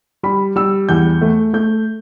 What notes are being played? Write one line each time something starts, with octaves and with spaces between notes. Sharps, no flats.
G3 B5
G3 E6
E2 G6
A3
A3 G6